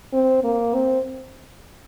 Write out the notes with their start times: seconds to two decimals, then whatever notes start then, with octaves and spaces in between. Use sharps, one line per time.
0.13 C4
0.44 A#3
0.74 C4